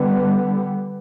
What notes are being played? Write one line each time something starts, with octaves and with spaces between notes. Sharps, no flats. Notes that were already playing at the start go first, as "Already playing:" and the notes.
Already playing: D3 G3 B3